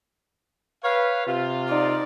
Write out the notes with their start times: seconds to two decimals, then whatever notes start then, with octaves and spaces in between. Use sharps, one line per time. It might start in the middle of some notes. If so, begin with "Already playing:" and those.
0.84 B4 C#5 F5
1.26 C3 F4
1.69 D#4 D5